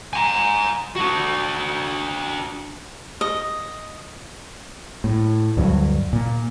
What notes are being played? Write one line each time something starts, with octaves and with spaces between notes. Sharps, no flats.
G#5 A#5
D4 F#4
D#5
A2
D2 G2 F#3
A#2